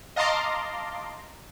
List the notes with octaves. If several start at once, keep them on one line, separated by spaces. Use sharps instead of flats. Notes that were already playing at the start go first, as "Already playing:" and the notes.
D#5 F5 A5 A#5 C6 D6